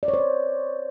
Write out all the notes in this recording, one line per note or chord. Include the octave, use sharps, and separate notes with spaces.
D5
C#5
C5